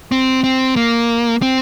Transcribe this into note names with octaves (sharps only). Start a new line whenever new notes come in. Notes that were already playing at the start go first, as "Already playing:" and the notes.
C4
C4
A#3
C4